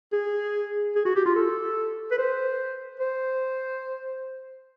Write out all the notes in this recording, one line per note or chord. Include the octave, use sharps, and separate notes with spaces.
G#4
G#4
F#4
G4
F4
A4
B4
C5
C5